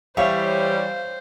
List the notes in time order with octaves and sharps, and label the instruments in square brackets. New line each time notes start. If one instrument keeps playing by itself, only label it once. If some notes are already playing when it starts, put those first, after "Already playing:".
[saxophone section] E3 G3 [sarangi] C5 [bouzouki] C#5 [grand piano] E5 F5